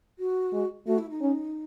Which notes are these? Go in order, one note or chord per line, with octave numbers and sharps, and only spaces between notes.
F#4
G#3
A3 F#4
E4
D#4
C#4